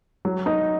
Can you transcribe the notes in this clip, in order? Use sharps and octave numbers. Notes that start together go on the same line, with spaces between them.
F#3
D#4